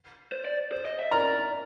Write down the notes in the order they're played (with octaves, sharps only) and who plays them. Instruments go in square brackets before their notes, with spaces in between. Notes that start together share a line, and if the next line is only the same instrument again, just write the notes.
[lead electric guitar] C5
D5
C5
D#5
E5
[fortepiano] A#4 A#5 [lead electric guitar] D5